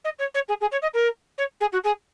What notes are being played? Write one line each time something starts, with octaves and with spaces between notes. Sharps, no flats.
D#5
C#5
C#5
G#4
G#4
C#5
D#5
A#4
C#5
G#4
F#4
G#4